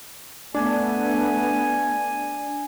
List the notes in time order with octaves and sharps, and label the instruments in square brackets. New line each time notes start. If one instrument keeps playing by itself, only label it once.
[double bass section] A3 B3 [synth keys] D4 [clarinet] G#5